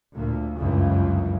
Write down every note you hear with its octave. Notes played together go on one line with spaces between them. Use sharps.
D2 A#2
G1 C#2 F#2 C#3 E3